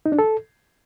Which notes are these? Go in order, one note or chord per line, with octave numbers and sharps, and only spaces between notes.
D#4
D4
A4